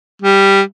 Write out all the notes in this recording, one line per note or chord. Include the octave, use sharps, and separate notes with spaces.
G3